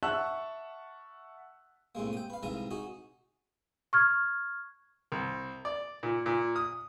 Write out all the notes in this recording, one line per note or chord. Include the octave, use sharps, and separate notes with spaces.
E5 F#5 A5 C#6 E6 F#6
A2 C3 G#3 A#3
G5 D#6
B4 F5
C2 G#2 E3 A#4 A#5 D#6
D#4 F#4 G#4
C#6 F6 G#6
C2
D5
A#2
A#2
D#6